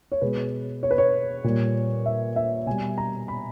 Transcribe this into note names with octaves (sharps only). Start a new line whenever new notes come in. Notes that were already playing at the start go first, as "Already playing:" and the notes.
C#5
B2 G#3 B4
C#5
B4
C#5
A#2 G3
E5
E5
B2 G3 G#5
A#5
B5